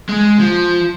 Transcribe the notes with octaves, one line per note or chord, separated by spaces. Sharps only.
G#3
F3